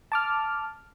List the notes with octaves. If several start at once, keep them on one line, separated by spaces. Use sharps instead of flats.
A5 D6 F6